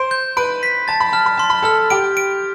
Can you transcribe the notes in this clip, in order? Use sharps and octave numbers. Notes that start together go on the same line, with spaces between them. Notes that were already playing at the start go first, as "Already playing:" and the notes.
Already playing: C5 C6 D7
G6
B4 B5 D7
B6
A5 A6
B5
A5 F6
B5
A5 C6
B5
A4 A5 F6
G4 G5 D7
D7